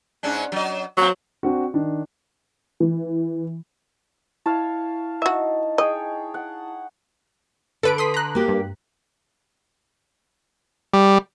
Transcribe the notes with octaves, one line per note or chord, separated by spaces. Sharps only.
G#2 C#4 D4
F#3 D#5
F#3 A#3 C4
C4 D4 F#4
D#3 D4
E3
E4 C#5 F5 A5
D#4 F#4 E5
G#4 C#5 D#5 G5
F#5
D3 A4 B4 D7
C6 D#6 B6
A#5 F#6
A#3 G4
G2
G3